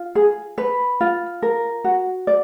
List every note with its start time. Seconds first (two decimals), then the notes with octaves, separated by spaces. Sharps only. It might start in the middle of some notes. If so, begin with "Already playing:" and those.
Already playing: F4
0.15 G#4
0.58 B4
1.01 F4
1.42 A#4
1.84 F#4
2.27 D5